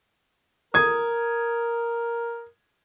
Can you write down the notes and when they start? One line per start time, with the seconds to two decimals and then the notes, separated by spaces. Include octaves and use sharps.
0.74 A#4 D#6 G#6